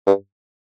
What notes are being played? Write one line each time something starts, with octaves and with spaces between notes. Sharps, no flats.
G2